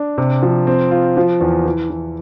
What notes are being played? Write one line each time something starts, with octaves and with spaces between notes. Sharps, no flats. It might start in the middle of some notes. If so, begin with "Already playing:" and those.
Already playing: D4
C3
F3
C4
F4
F3
E2
E3
E3